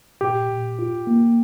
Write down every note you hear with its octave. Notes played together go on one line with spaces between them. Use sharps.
A#2 G4
A#2
F4
A#3